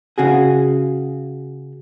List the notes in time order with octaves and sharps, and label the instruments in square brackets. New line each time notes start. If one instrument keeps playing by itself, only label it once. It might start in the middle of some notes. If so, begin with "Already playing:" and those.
[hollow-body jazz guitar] C#3 F#4 G#4